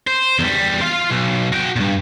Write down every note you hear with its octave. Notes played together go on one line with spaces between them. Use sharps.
C5
E2 G3
F4 F5
B1
F#4 G5
G2 A#2